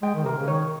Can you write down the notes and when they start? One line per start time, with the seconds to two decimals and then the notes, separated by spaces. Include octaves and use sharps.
0.02 G#3 G5
0.15 D#3
0.25 C3 A#4
0.37 C#3
0.48 D#3 C#5